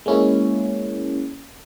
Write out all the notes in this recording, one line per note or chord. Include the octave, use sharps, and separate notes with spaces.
G#3 A#3 C#4 E4